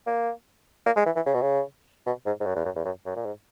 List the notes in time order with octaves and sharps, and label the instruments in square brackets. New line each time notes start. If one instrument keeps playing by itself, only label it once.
[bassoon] A#3
A#3
G#3
E3
E3
C#3
B2
C#3
B2
G#2
G#2
F#2
E2
F#2
E2
F#2
F#2
A#2
G#2